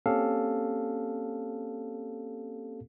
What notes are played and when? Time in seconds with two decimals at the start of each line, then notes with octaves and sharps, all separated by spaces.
0.06 A#3 C4 C#4 G4 A4 F5